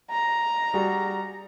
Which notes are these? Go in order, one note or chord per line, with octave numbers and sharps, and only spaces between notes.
A#5
G3 F#4 G#4